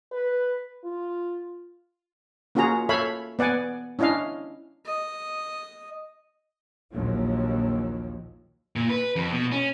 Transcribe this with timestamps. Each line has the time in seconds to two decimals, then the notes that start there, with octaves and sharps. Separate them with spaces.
0.12 B4
0.84 F4
2.55 A#3 C#4 F4 F#4 G#4 A#5
2.89 A4 C#5 E5 F5 B5
3.39 B3 D5 F#5 G#5
3.99 C#4 D4 E4 D#5 F5
4.86 D#5
6.93 A#1 D#2 F3 F#3
8.76 A#2
8.89 B4
9.16 F2
9.31 B2
9.52 C#4